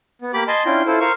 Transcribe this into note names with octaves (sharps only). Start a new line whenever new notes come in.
B3
A#3 G4 B5 D6
D#5 G#5 A5 C6
C#4 D4 E4 F4 G5 C6
E4 F4 A4 C5
A#4 C5 F5 C#6